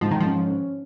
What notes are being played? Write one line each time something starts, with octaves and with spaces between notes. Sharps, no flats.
G#2 F3
D#3
F3 C#4
C#4